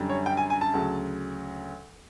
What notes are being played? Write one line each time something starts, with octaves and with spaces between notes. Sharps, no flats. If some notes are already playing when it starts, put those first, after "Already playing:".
Already playing: F#2 D3 G3
C#5
G5
G#5
G#5
A5
D2 C#3 F#3